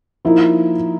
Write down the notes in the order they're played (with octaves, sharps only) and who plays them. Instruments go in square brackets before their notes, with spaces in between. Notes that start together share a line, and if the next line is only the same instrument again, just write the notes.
[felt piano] F3 A#3 D#4 [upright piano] E4